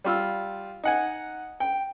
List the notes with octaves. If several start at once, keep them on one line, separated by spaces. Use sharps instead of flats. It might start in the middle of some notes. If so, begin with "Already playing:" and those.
G3 F4 E6
D#4 F#5 G#5
G5